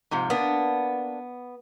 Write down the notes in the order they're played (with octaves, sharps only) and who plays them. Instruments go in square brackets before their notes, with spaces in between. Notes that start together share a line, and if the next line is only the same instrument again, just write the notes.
[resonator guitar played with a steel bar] G#2 C3 F3
[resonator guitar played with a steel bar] A#3 D4 [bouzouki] B3